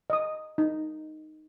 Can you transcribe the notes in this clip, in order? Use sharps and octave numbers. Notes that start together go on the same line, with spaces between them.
D#5 D#6
D#4